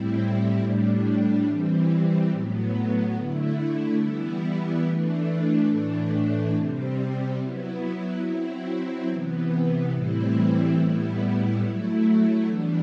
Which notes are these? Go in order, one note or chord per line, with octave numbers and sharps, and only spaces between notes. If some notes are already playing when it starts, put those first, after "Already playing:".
Already playing: A2 G3 C4 E4
A2 G3 D4
E3 G3 C4
A2 F#3 B3
D3 A3 E4
E3 G3 B3 E4
E3 A3 D4
A2 E3 A3 D4
C3 G3 C4
F#3 B3 E4
F#3 C4 E4
C3 E3 B3
A2 E3 G3 C4 E4
A2 G3 B3 E4
F#3 A3 E4
E3 G3 B3 D4